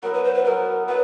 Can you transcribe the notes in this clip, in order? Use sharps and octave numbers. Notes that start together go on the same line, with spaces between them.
F#3 B3 E4 A#4
B4
C5
B4
F#3 B3 E4 A#4
F#3 B3 B4